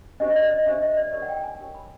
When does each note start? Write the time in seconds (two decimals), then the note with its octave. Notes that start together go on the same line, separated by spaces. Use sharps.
0.20 D4 G4 C5 D#5
0.30 D#5
0.36 D5
0.51 D#5
0.66 D4 G4 C5 E5
0.82 D#5
0.97 D5
1.12 D#4 G4 A#4 C#5 D5
1.22 F#5
1.28 G5
1.44 G#5
1.59 D#4 G4 A#4 C#5
1.75 B5